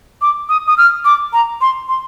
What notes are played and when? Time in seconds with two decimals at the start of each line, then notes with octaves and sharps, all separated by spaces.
0.22 D6
0.49 D#6
0.67 D#6
0.78 F6
1.05 D6
1.33 A#5
1.61 C6
1.88 C6